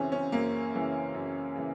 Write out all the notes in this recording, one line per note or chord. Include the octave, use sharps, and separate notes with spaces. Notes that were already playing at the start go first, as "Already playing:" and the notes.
Already playing: F#2 C#3 E3 C4 C#4
C#4
F#2 A#3
C#3 E3
F#2
C#3 E3